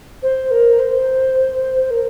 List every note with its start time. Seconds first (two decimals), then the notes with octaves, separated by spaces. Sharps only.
0.22 C5
0.51 A#4
0.79 C5
1.90 A#4